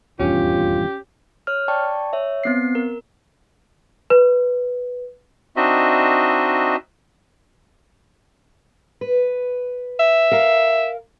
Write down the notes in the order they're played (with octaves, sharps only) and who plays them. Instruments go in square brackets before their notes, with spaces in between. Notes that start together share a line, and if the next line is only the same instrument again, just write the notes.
[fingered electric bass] D#1 E2 G2 [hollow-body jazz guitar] C#4 [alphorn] F4 [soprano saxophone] G4
[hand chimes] C#5 F6
D5 G5 A5 C#6
C#5 E5
B3 C4 C7
A#4
[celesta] B4
[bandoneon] C4 D4 D#4 F#4 D#5 E5
[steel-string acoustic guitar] B4
[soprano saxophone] E5
[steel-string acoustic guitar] A#4 F5 A#5